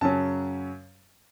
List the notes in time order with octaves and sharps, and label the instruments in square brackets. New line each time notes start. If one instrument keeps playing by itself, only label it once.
[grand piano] F#2 C#3 F#3 C#4 A5